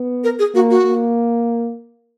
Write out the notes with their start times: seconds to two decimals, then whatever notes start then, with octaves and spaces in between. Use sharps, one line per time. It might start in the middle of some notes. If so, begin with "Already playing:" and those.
Already playing: B3
0.24 A#4
0.39 G#4
0.54 A#3 F#4
0.71 F#4
0.86 A#3